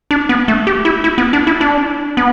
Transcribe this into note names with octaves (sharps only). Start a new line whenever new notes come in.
D4
B3
A3
G4
E4
E4
B3
D4
E4
D4
B3